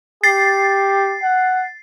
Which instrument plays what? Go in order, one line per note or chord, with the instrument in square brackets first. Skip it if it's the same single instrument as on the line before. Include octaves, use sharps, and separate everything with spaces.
[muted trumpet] G4 [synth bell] A6 C7
[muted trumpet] F#5